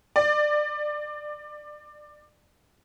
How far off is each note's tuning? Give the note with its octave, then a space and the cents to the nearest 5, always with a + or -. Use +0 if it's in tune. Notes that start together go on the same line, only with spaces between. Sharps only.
D5 +25